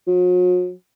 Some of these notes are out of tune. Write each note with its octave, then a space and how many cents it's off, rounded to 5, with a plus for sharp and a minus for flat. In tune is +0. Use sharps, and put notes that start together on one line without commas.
F#3 -45